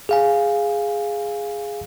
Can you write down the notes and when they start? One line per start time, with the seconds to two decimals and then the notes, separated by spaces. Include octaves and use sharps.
0.09 G#4 F5 G#5